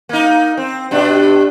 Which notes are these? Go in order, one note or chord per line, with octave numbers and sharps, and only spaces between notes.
A#3 D#4
C4
G2 B2 D4